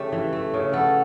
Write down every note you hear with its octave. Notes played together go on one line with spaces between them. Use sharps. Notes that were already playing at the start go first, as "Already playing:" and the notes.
Already playing: C#3 A3 G4
E3
A3
C#3
B3 A4